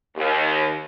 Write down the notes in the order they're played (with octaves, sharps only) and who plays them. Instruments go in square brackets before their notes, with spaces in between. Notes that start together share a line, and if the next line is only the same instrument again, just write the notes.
[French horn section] D#2